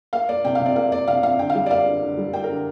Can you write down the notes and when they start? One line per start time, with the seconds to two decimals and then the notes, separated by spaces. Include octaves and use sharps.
0.13 A#3 F5
0.29 A#3 D5
0.45 C3 G5
0.55 F5
0.60 C3
0.66 D5
0.76 A#3 F5
0.92 A#3 D5
1.08 C3 F5
1.23 C3 F5
1.39 D3 G5
1.50 F5
1.54 G3
1.66 D5
1.70 A#3 F5
1.86 D3
2.02 D3
2.18 G3
2.33 A#3 G5
2.44 A#4
2.49 D3